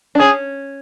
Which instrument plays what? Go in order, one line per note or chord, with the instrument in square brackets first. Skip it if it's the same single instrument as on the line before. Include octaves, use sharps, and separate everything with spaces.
[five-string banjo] D4
[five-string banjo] C#4 [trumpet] G#4